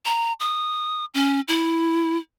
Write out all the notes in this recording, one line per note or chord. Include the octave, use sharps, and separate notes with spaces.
A#5
D#6
C#4
E4